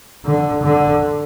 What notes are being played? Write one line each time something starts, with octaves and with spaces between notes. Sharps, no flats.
D3
D3